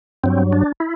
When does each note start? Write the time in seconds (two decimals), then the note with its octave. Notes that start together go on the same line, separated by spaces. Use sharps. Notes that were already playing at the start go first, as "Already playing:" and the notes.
0.24 G2 F#3 C4
0.53 D4
0.80 E4